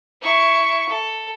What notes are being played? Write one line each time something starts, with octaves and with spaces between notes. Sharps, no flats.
E4 C#6
A4